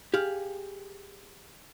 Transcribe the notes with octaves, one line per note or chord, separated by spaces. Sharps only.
G4 G#4 F5